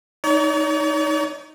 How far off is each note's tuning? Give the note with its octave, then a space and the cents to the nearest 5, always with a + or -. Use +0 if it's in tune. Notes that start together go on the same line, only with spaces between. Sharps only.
D#4 +0 C#5 +45